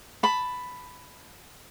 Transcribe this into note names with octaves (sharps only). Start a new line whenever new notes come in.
A5 B5